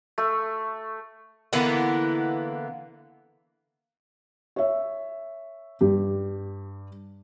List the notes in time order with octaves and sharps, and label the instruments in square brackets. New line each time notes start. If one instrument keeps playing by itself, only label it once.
[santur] A3
[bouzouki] D3 E3 A#3 B3
[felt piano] C#5 E5
G2 G4